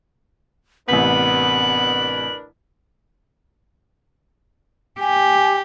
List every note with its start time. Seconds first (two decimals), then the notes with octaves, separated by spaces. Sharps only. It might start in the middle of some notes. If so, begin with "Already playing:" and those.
0.88 A1 C3 B3 D4 A#4 B4 B6 F#7
5.00 G4 G#5